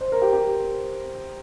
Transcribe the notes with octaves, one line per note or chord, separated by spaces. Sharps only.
C5
A#4
G4
G4